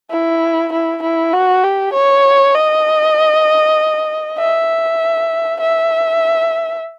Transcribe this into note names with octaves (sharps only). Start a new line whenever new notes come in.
E4
E4
E4
F#4
G4
C#5
D#5
E5
E5